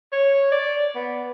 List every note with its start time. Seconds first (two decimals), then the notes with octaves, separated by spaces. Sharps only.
0.12 C#5
0.52 D5
0.95 B3